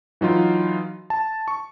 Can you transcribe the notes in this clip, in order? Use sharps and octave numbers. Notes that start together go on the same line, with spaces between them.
E3 F#3 D#4 F4
A5
C#6